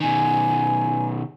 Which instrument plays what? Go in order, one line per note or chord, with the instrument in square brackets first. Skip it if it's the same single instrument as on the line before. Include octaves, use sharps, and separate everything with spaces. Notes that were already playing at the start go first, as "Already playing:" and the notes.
[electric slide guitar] B2 D#3 [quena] G#5